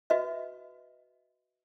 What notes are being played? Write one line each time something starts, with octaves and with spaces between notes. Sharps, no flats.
F#4 B4 D#5 E5